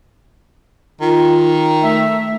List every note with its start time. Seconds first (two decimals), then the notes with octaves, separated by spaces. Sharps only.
1.01 D#3 F4
1.82 A3 E5